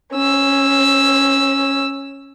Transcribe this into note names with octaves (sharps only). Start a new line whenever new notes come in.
C#4 E6